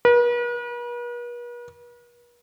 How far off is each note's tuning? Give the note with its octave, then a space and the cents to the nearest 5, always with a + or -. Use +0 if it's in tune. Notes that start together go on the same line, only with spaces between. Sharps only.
B4 -45